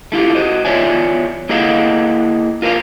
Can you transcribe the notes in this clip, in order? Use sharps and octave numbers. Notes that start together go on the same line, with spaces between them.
A3 E4 F4 G4
F#4 C5 D#5
E2 F4 C#5 D5 E5 G#5
A#3 E4 G#4 D#5 F5 F#5
F4 A#4 C5 F5